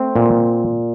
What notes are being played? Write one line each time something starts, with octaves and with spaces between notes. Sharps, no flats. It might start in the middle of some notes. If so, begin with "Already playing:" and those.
Already playing: A3 C4
A#2